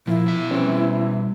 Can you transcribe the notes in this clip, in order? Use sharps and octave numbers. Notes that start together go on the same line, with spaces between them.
A#2 F3 E4
B2 E5
E3 G3 C4 C#4